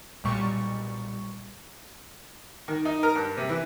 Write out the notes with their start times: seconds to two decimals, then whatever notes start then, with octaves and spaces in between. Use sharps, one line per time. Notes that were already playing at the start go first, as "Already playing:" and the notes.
0.24 B1 A#2 G3 C#6
2.68 D#3
2.85 D#4
3.03 A#4
3.15 G2
3.37 C3
3.49 E3